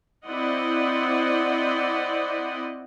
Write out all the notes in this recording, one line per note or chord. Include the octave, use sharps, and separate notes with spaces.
C4 E4 C5 D5 D#5 F#5